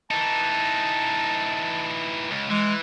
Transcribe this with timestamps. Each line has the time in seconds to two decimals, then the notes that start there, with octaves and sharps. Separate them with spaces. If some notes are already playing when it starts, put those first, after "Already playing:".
0.11 E3 D#4 A5
2.31 C#2
2.50 E3 G#3